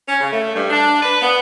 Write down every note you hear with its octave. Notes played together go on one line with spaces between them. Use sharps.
C#4
C#3
A3
G2
D4
B4
B3